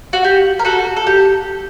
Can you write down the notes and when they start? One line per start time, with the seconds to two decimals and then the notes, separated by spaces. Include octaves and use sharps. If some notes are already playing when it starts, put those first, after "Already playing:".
0.13 F#4
0.25 G4
0.59 A#4
0.65 F#4 A4
0.97 A4
1.07 G4